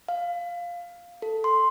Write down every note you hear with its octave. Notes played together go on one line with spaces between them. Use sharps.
F5
A4
C6